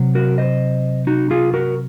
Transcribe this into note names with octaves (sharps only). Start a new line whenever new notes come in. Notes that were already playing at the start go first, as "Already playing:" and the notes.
Already playing: C3 F#3
F#4 A#4
C5 D#5
D#4 F#4
F4 G#4
F#4 A#4